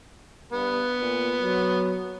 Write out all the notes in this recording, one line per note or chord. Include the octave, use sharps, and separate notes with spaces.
G2 B3
A#2
F#3